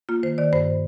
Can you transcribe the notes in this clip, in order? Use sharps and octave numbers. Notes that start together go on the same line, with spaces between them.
A#3 F4
D#3 C5
D#3 D5
G2 C5